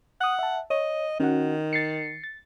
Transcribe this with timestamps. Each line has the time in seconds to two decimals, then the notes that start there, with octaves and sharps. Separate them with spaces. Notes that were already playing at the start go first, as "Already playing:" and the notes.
0.21 F#5 D#6 F#6
0.39 E5 A5
0.70 C#5 D#5
1.20 D#3 C#4 F#4 F#5
1.73 A6 C7 C#7
2.24 A6